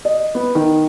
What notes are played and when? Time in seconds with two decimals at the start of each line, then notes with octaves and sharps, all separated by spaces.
0.05 D#5
0.35 B3
0.55 D#3